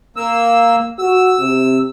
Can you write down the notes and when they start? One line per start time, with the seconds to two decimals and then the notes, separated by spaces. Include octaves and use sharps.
0.16 A#3 E6
0.99 F#4 E6
1.39 C3